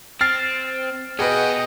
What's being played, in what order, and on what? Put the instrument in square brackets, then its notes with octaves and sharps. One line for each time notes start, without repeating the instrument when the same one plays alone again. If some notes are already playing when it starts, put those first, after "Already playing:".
[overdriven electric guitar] C4 [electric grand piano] F6 A6 C7
[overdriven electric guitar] B3 F#4 [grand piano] G#4 B4 [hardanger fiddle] D#5 G5